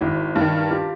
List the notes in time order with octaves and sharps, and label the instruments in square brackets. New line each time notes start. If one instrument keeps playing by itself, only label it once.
[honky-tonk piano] G#1 [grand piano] E4 F#4
[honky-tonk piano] G2
D#3
[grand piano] F4 G4